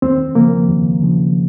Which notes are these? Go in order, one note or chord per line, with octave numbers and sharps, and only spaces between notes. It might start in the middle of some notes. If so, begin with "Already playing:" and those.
D#2 C4
C#3 F3 A#3
D#2
C#3 F3